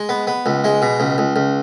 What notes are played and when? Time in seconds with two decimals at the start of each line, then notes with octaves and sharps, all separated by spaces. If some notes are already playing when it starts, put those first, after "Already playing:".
Already playing: G#3
0.09 B3
0.27 B3
0.46 C#2
0.64 G#3
0.82 B2
1.00 C#2
1.18 C#2
1.36 C#2